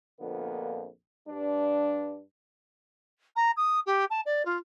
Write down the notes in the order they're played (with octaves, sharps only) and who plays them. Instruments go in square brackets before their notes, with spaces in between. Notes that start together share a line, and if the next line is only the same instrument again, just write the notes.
[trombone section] A#1 F2 D3 A#3 B3
G2 D4
[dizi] A#5
D#6
G4
A5
D5
F4